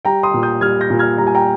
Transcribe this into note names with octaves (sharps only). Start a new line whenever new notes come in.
G3 G5 A#5
C6 D#6
A#2
D#6 G6
G3 F6 G#6
G6 A#6
A#2
F6 G#6
G3 A#5
G#5
G5 A#5